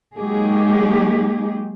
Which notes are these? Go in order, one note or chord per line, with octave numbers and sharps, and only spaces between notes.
F#3 G#3 A#3 D#4 G4 G#4